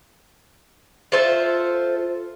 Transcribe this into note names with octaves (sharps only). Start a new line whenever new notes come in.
F4 A4 C5 E5